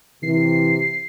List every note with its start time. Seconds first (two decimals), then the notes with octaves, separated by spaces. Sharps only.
0.23 C3 E3 C7